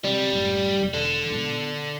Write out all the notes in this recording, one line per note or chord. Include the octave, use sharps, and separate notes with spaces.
C3 G3
F#1 A2
E1 E3
D3
A#2 B3